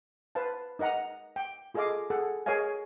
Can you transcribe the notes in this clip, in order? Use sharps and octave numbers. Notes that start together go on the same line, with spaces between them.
B4 C5 F5 A5
D#4 A#4 D#5 F#5 A#5
G5
F4 G#4 A4 D#5 F5 D6
G#4 A4 F#5
G#4 A#4 C#5 D#5 F5 G#5